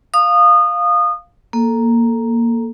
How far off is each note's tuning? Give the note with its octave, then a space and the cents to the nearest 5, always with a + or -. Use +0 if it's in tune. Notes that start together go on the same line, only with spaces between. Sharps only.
F5 +0 D#6 -25
A#3 +0 A4 +0